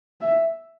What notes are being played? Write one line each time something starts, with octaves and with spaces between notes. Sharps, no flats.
E5